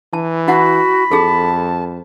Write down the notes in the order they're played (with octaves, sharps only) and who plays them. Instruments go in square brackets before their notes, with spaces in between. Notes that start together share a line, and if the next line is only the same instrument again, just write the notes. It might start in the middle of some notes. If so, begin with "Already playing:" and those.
[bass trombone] E3 [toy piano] A5
[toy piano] E4 F#5 [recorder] F#4 [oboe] B5
[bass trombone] F2 [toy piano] G#4 A4 [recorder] A5